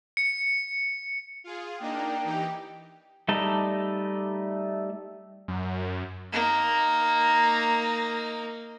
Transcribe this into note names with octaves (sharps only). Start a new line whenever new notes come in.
C#7
F4 G#4
A#3 D4 D#4 G5
E3 D#4 G4
G3 A3 D#4 D#5 A5
F#2
A#3 D#4